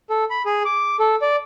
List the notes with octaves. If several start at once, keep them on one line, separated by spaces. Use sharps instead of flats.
A4
B5
G#4
D6
A4
D5